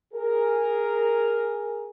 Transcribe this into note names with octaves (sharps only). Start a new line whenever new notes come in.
G#4 A#4